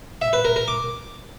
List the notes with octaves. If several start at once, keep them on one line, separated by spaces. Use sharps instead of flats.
E5
B4
A#4
A#4
D6